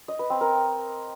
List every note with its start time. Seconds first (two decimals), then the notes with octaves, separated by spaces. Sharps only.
0.08 D#5
0.19 B4
0.30 C4
0.41 A#4